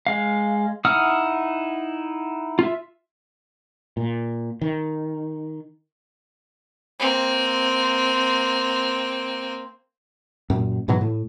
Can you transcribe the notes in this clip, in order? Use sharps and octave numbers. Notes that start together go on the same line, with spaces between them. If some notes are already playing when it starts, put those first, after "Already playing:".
G#3 F5
D#4 E4 F#5 D#6 F6
F4 E5
A#2
D#3
A#3 C4
F#2 A#2
G#2 B2 E3 F#3
A2